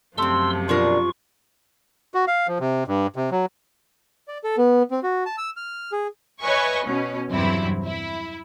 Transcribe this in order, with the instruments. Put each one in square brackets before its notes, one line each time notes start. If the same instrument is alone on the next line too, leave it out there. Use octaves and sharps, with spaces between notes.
[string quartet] F#2 C3 F3 [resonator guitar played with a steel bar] A3 C4 [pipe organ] C6 E6
[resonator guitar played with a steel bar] B2 D4 A#4 [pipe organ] F4 C#6
[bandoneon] F#4
F5
F3
C3
G2
C3
F#3
[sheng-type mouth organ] D5
A4
B3
C4
F#4
A5
E6
F6
G#4
[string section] B4 C#5 D#5 E5 G#5 C#6
B2 C#4
E2 G2 C3 F#3 C4 E4
E4